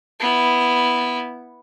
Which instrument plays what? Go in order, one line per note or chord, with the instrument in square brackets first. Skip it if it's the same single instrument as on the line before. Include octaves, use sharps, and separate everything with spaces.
[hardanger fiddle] B3 E4